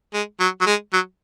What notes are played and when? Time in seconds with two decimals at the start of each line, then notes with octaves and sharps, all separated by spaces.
0.14 G#3
0.40 F#3
0.61 F#3
0.66 G#3
0.93 F#3